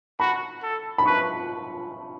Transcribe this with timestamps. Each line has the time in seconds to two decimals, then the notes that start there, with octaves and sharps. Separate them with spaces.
0.20 F#4 B5
0.63 A4
0.98 B5
1.06 B4 C#6